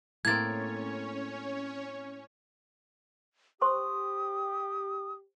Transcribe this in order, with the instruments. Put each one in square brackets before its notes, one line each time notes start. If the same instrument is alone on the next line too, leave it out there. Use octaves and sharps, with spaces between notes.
[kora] A2 A#3 C4 [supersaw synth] C#4 C#5 [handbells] G#6 A6
[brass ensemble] G4 [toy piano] C5 C6 C#6 [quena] D#6